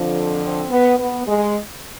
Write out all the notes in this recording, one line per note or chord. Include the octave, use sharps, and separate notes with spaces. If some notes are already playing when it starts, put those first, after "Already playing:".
Already playing: F2 D3 F3
C4
B3
B3
G#3